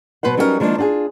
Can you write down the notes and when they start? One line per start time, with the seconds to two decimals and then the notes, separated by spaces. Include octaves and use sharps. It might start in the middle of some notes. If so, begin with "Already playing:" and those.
0.23 B2 F#3 B4 C5 F#5
0.37 F#3 G3 C#4 D#4 G4 A#4
0.60 D#3 F3 G#3 A#3 D4
0.78 D4 F4 G4 G#4